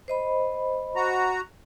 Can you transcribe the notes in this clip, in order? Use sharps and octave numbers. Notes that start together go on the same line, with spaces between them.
C5 D#5 B5
F#4 A#5